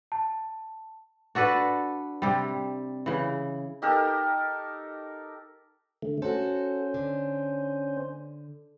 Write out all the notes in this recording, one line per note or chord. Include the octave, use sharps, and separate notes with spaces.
A5
D4 F#4 A4 B4
C3 G3
C#3 E3
D#4 G4 A4 A#4
D3 A3
C#4 F#4 A4 C5
D3